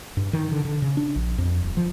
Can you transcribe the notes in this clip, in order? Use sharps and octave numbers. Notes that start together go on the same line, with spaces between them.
G2
D#3
D3
D3
C#3
D4
A#1
F2
D#1
F3